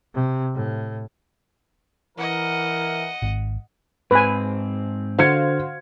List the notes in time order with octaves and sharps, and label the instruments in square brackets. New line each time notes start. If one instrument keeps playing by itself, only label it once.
[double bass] C3
A2
[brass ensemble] E3 A#4 [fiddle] D#5 F#5
[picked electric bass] G#1
[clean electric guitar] G#2 C4 [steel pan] B4 G#5
[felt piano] D3 G#6 C#7 [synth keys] F#4 C5 F5